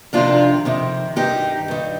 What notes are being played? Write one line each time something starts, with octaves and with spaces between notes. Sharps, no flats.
F2 C3 D#3 D4 F4
F2 C3 D#3
G2 D#3 D#4 G4
G2 D#3